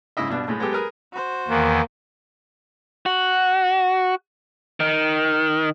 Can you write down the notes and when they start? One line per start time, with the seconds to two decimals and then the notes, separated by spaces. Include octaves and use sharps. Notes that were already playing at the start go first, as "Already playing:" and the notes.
0.17 G#2 C#3 E4 D#5 E5
0.29 G2 B2 D4
0.48 A2 G#3 A3
0.60 G#3 B3 G4 A4
0.73 G#4 A#4 B4
1.12 F#4 C5
1.48 E2 D#3 E3 A#3
3.06 F#4
4.80 D#3